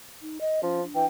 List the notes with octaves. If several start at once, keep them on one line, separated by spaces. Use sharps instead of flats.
D#4
D#5
F3 C#4
D4
E3 G5